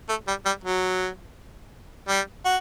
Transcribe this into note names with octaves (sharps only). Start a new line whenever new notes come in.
A3
G3
G3
F#3
G3
F#4